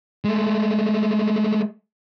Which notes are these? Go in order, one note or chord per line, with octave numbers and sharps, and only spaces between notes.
G#3 A3